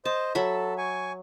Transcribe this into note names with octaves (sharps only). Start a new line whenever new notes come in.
C5 D#5 A5
F#3 A4 E5 B5
G#5 C#6